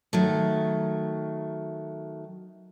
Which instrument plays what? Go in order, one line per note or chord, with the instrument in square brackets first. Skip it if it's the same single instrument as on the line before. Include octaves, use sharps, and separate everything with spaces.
[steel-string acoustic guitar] D#3 F#3 A3